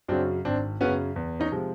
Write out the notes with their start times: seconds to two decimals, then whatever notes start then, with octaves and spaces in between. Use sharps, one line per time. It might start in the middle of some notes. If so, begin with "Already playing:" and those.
0.08 F#2 C#3 F#3 C4 D4
0.45 G#1 C4 D4
0.81 F#2 C#3 F#3 B3 C#4
1.16 E2
1.40 C#4 D#4
1.52 C3 F3 G#3